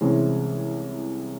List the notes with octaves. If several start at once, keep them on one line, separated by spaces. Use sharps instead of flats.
C2 C3 E3 G#3 C#4